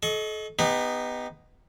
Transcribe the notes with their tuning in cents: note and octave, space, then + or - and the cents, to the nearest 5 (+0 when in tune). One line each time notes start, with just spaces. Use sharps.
A4 -35 D#5 +10 C#6 +5
B3 +10 D#4 +0 G4 +35